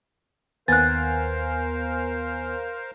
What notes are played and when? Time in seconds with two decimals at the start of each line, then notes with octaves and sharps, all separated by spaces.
0.68 D#2 B3 A#4 C5 F5 G#5 F#6 A6